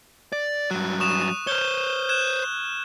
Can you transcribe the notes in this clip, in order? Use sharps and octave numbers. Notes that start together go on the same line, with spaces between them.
D5
G2 F#3 F#6
C#6 D#6 E7
C5 C#5 F6 G6 G7
F#6 G#6 E7